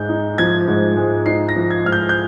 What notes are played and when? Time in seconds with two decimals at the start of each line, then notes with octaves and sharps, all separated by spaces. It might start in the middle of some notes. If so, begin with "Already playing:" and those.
Already playing: G#2 G#3 G6
0.09 D#4
0.38 F3 G#6
0.68 G#2
0.97 G#3
1.26 D#4 C7
1.49 A#6
1.56 F3
1.70 G#6
1.85 G#2 F6
1.92 G6
2.09 G6